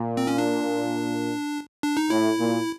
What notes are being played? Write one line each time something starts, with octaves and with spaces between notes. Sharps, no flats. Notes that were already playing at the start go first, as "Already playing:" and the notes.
Already playing: A#2
C4
C#4
D4
D4
D#4
A2 E4
A#2